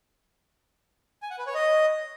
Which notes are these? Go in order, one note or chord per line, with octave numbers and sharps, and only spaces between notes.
G#5
F#5
B4
C#5
D#5